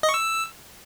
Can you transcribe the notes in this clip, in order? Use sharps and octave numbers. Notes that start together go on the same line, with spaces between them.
D#5
C#6
E6